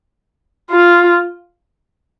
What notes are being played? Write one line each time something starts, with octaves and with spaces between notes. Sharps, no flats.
F4